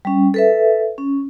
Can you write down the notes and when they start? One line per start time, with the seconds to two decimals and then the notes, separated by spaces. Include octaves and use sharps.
0.05 G3 C#4
0.34 A4 B4 E5
0.98 C#4